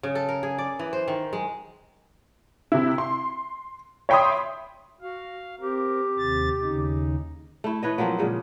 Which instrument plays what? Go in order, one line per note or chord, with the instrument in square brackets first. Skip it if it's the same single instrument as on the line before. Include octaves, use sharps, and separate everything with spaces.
[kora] C#3
A4
A#4
G#4
D5
E3
C5
D#3
G#3
[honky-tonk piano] C3 E4
C6
C#5 E5 G5 B5 C6 D#6
[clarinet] F#4 [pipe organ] F5
[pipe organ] C4 A#4 [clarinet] G4
[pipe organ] D#2 C3 A6
D#2 C#3 D#4
[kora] A3 E4
E3 B4 C#5 D#5
F3 F#3 A#3 C4
A#2 C#3 G#3